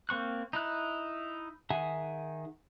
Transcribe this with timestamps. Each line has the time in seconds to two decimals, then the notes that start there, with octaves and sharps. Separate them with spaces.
0.09 A#3 C4 C#6 F#6
0.53 D#4 E4 F#6
1.70 D#3 G#4 E5 F#5 G#5